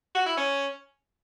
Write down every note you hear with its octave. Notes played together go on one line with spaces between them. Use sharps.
F#4
E4
C#4